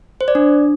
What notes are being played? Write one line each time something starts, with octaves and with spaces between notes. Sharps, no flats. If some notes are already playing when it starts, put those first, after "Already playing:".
C5
D5
D4